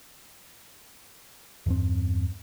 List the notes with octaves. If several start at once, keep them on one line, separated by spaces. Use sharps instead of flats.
E2 G2 C4